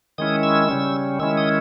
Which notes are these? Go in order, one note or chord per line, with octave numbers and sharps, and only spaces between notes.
D#3 G#3 C#4 E4 D#6
E6
C#3 G3 C#4
D#3 G#3 C#4 E4 E6
D#6